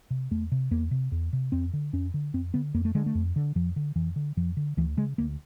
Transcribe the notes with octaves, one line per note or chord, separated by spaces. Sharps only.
C3
E2 A3
C3
E2 A#3
C3
E2
C3
F2 C4
D3
F2 C#4
D3
F2 C4
D3 B3
F2 A#3
A3
D3 G#3
A3
F2
D3
F2 F3
D3
F2 E3
D3
F2 F3
D3
D2 E3
C#3 G#3
D2 A#3